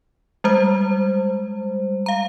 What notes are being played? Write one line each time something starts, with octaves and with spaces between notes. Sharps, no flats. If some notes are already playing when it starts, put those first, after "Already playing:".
G3 G#3 C5
F5 A#5